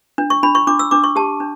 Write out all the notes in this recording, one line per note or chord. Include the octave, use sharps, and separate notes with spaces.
D4
C#6
D4 B5
C#6
D4 D6
E6
D4 D6
C#6
G4 A5
D4